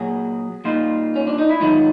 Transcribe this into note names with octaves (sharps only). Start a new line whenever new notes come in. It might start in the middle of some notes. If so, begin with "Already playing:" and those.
Already playing: A#2 F#3 F#4 G#4
A#2 G3 D#4 F4
C#4
D4
D#4
E4
G#2 D#3 F#3 D#4 F4